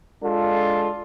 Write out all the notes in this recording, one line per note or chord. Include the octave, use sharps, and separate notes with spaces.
G#3 D4 F4 A4